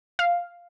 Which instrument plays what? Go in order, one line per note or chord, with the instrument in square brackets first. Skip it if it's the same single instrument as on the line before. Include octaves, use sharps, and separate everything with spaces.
[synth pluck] F5